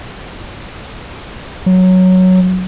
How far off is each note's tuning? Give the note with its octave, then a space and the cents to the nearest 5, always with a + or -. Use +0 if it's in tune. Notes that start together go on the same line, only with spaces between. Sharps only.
F#3 +0